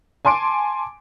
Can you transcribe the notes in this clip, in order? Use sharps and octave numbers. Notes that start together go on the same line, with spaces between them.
G#5 A5 C6 D6 D7